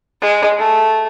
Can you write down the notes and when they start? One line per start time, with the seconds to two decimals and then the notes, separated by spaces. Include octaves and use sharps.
0.21 G#3
0.58 A3